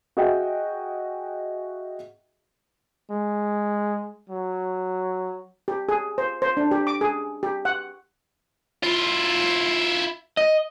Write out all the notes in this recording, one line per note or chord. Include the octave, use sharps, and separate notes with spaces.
F#4 G#4 D#5 E5 G5
G#3
F#3
G4
G#4
C5
C5
D4
G4
D6
G#4
G4
F#5
E4 F4
D#5